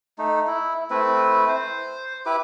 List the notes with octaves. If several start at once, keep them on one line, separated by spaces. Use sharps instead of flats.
A3 D#4
E4
A3 C4 E4 B4
C5
E4 G4 B4 D6